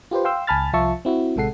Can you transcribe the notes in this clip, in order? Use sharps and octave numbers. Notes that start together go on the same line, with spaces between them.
F4 G4 B4 C5
F5 G5 C6 E6
C#2 G#5 A5 B5 F6 A6
C2 F3 F4 E5 A5 C#6
C4 E4 F#4
A1 C3 G#3 A4 F#5 C7